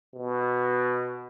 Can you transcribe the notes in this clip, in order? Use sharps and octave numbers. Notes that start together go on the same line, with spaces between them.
B2